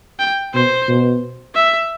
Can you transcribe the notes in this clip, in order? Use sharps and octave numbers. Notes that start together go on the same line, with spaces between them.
G5
B2 C5
B2
E5